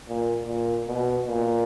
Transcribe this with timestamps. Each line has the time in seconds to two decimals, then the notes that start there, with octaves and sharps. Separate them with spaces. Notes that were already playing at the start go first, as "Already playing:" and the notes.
0.08 A#2
0.47 A#2
0.88 B2
1.27 A#2